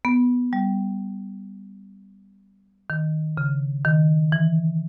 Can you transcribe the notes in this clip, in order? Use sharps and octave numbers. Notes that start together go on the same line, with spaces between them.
B3
G3
D#3
C#3
D#3
E3